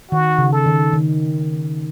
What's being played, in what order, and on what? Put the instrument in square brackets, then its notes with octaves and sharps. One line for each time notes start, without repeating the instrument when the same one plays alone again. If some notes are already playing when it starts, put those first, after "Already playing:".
[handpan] D#3 [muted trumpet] F#4
[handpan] C#3
[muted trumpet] A4
[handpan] D#3
D#3